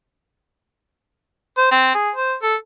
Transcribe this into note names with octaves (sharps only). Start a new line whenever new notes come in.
C5
C4
G#4
C5
A4